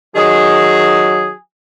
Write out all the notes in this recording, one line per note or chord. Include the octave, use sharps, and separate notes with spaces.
D#3 F#3 G#4